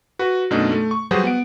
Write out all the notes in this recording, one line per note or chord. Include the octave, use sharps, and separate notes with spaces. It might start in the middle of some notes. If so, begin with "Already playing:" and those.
F#4 B4
F#2 B2 A3 D4 D#4
A3
C#6
F#3 G3 F#4 G#4 B4 C5
B3 F#5 D7